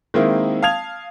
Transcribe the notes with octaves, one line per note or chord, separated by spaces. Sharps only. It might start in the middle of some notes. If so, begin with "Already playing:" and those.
D#3 G#3 A#3 C4 E4
F5 A5 D#6 G#6 F7